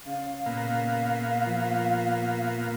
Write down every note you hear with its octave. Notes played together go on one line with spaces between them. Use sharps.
C#3 F5
A#2 A#3 B3
F3